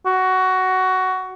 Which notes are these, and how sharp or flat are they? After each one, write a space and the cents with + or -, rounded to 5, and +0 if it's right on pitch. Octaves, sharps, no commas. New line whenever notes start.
F#4 +15